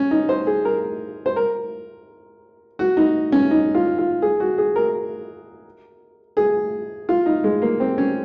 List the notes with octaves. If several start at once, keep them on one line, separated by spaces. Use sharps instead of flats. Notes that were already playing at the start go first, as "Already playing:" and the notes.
Already playing: C#4
D#4
C5
G#4
A#4
C5
A#4
F#4
D#4
C#4
D#4
F4
F4
G#4
F#4
G#4
A#4
G#4
F4
D#4
G#3
A#3
C4
C#4